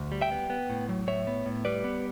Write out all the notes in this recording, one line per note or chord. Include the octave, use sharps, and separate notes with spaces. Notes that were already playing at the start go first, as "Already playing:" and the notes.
Already playing: D2
G3
E5 G5
B3
B3
A2
F#3
A2 C#5 E5
B3
A2
G3 B4 D5
B3